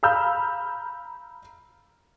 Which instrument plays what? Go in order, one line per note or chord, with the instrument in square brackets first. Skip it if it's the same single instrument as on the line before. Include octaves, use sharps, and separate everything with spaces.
[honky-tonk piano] F5 A#5 B5 E6 F6 G6